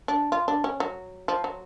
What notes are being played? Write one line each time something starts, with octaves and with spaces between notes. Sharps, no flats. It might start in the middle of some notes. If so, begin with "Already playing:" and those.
D4
F4
D4
C#4
F#3
F3
F#3